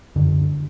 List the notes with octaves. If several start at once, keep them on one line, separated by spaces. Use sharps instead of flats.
F#2 D3